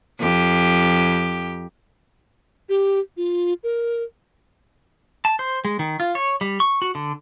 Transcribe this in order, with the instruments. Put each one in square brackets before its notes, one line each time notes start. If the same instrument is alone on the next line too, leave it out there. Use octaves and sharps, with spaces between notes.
[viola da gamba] F2 G4
[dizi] G4
F4
A#4
[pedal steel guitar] A5
C5
G#3
D#3
F4
C#5
G3
C#6
F#4
D3